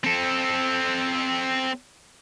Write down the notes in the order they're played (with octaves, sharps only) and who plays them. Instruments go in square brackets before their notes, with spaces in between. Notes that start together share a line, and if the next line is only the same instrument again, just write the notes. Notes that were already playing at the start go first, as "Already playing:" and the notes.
[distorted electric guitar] C4 A4